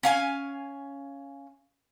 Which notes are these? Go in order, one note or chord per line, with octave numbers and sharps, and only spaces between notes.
C#4 F5 G#5